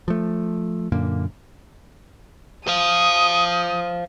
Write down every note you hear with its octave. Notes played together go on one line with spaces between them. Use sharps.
F3 A3
F#2 A#2 D3 A#3
C5 F5 D#6